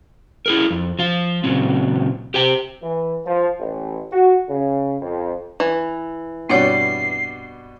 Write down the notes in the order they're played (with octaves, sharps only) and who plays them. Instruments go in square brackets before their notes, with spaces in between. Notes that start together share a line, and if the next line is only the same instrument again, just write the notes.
[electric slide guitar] E4 G#4 A#4
F2
F3 F4
A#2 C#3 F#3 C4
G4 C5 G5
[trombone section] E3
F3
A1
F#4
C#3
F2
[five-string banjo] E3
[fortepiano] G2 B2 D5 [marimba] C4 C#5 [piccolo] C7